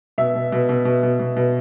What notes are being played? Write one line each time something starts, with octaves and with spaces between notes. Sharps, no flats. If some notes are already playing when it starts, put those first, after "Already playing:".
B2 E5
B2
B2
B2
B2
B2
B2
B2